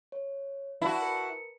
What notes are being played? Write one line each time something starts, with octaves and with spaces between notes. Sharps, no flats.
C#5
E4 F#4 B4 D5 A5
A#4 B4 C#7